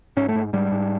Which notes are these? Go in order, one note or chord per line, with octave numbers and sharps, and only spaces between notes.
G#2 C#4
A3
G#2
G#2 G3
G#2